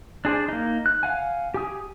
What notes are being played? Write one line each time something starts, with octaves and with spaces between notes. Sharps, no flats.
D4 G#4 C5 D5
A#3 D#4
F#6
F5 F#5 G#5
G4 G#5 D#6